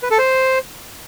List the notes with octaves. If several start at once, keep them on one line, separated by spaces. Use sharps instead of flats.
B4
A4
C5